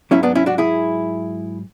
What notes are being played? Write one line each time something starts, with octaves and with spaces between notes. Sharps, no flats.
G#2 F#3 C#4 E4
B3 D4
C#4 E4
D4 F#4
E4 G#4